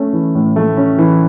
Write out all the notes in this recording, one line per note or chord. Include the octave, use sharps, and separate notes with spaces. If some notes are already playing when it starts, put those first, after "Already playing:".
Already playing: A3 C#4
E3
A2
A3
C#4
E3